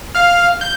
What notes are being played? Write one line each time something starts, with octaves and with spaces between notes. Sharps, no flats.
F5 F6
G6